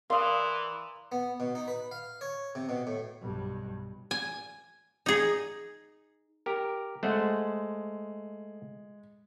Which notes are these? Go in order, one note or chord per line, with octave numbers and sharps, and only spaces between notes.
E3 A#4 D5 F5 C6 D#6
B3
B2
D#4
B4
F5
C#5
C3
B2
A2
B1 G2
G#5
D#4 G#4
G4 A#4
G#3 A3 C5 F#5